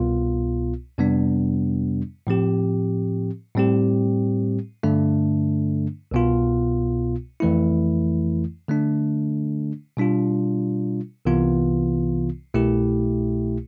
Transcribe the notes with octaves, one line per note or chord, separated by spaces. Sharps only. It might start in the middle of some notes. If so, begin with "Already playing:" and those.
Already playing: C2 B2 B3 F4
F2 C3 G3 B3 D4
A2 F3 C4 G4
A2 G3 C4 G4
G2 D3 A3 D4
C2 B2 B3 F4
F2 E3 A3 E4
D3 A3 D4
B2 G3 D4 F4
C2 C3 E3 B3 F4
C2 B2 A3 E4 G4